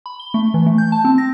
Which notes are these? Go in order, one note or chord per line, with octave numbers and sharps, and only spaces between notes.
B5
G7
A3
E3
A3
G6
A5
C4
A#6